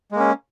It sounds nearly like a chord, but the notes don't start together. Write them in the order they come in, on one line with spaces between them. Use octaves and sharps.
G#3 A#3 C#4